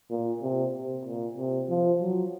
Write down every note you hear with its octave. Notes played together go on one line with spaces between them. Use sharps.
A#2
C3
C3
A#2
C3
F3
F#3